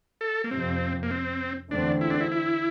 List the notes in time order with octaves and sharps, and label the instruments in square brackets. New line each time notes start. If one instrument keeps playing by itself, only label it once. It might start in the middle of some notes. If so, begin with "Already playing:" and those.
[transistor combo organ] A4
A#3
[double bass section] F2 C3 F3 [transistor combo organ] C4
[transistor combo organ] A#3
C4
[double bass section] E2 D3 A3 C4 [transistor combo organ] D4
[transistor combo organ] E4
D4
E4
E4